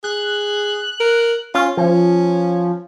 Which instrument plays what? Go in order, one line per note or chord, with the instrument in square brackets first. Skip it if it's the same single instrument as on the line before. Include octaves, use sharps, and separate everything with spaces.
[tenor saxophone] G#4 [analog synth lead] F#6
[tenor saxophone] A#4
[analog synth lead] C#4 [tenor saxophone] F4
[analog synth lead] F3 [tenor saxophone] C#4